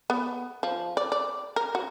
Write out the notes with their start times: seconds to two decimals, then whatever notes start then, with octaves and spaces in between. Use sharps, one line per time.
0.10 B3
0.63 F3
0.97 D5
1.12 D5
1.56 A#4
1.75 F#4